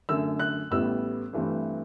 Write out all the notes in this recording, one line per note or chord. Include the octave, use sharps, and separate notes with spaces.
F#2 D3 A3 E6
F#6
A1 A2 G3 B3 E6
G2 E3 A3 C4